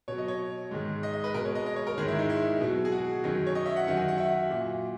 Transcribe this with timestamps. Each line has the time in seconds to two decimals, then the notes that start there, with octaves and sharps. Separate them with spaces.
0.08 B2 F#3 C#5
0.18 D#5
0.28 C#5
0.71 G#2 D#3 G#3
1.03 D#5
1.13 D#5
1.24 B4
1.34 B2 G#3 A#4
1.45 C#5
1.55 D#5
1.66 D#5
1.76 C#5
1.87 A#4
1.98 G#2 D#3 G#3 G#4
2.08 E4
2.19 D#4
2.30 E4
2.61 B2 F#3
2.85 G#4
2.92 F#4
3.24 F#2 D#3 F#3
3.47 C#5
3.55 D#5
3.66 E5
3.76 F#5
3.87 F#2 D#3 F#3 F#5
3.97 G#5
4.08 F#5
4.18 E5
4.27 F#5
4.51 A#2 F#3